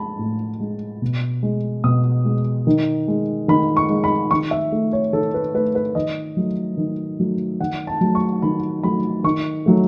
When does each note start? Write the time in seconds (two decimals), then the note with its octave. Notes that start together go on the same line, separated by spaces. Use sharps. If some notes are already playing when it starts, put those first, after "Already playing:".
Already playing: G#3 A5 B5
0.19 A2
0.60 G#3
1.02 B2
1.43 G#3
1.84 B2 D#6
2.25 G#3
2.67 D#3
3.08 G#3
3.48 D#3 B5
3.77 C#6
3.89 G#3
4.04 B5
4.31 D#3 C#6
4.51 E5
4.72 A3
4.93 C#5
5.13 D#3 A4
5.34 B4
5.54 A3 B4
5.75 B4
5.95 D#3 D#5
6.37 F#3 A3
6.77 D#3
7.19 F#3 A3
7.60 D#3 F#5
7.87 A5
8.01 F#3 A3
8.15 C#6
8.42 D#3 B5
8.83 F#3 A3 B5
9.24 D#3 C#6
9.66 F#3 A3